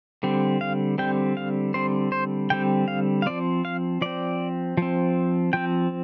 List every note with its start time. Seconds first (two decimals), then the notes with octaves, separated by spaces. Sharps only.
0.23 D3 G3 C4
0.61 F5
0.98 D3 G3 C4 G5
1.37 F5
1.74 D3 G3 C4 C5
2.12 C5
2.50 D3 G3 C4 G5
2.88 F5
3.22 F5
3.26 F3 C4 D5
3.65 F5
4.01 F3 C4 D5
4.77 F3 C4
5.53 F3 C4 G5